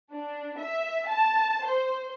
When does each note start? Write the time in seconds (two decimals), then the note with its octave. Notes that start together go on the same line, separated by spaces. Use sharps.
0.11 D4
0.58 E5
1.07 A5
1.64 C5